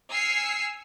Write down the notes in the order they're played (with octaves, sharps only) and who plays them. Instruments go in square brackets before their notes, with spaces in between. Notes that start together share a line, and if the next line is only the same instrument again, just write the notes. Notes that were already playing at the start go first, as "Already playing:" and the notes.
[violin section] G#5 E6 F6 C7 C#7